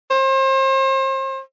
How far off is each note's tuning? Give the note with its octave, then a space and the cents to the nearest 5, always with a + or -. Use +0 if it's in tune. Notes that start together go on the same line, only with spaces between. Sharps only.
C5 +35